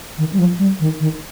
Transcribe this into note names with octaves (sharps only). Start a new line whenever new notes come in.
D#3
G3
F3
G3
D#3
D#3